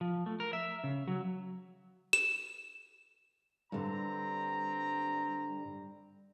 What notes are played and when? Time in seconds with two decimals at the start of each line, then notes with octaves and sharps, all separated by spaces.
0.01 F3
0.26 A3
0.40 A#4
0.53 E5
0.84 C#3
1.08 F#3
2.13 E7
3.72 G2 D3 G3 C4 A#5